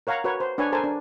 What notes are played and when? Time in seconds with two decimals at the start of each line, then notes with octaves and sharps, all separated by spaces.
0.07 A#4 C#5 F5 F#5 A#5
0.24 F#4 A#4 B4 C#5
0.40 C5
0.58 D4 B4 C#5 G#5
0.72 A4 A#4 C5 G#5 A5
0.84 D4